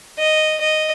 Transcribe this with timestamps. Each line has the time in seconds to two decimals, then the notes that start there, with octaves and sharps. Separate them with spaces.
0.18 D#5
0.61 D#5